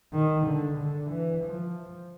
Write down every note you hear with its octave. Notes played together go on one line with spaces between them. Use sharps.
D#3
D3
D3
E3
F3